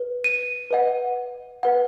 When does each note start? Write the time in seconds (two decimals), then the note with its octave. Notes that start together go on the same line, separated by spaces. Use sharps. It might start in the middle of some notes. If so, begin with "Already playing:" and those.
Already playing: B4
0.24 D#7
0.71 B4 D#5 F#5
1.63 B4 F#5